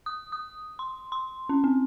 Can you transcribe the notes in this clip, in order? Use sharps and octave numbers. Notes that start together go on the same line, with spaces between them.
D#6
D#6
C6
C6
C#4
C4